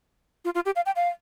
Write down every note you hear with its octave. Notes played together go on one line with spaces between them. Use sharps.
F4
F4
G4
F5
G5
F5